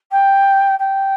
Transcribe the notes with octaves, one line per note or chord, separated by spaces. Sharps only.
G5
G5